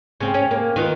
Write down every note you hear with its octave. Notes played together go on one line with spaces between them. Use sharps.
C#3 C4
C#4
A#3
D#3 B3 F4